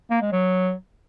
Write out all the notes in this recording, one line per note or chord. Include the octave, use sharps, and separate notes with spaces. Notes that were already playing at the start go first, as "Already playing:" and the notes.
A#3
G#3
F#3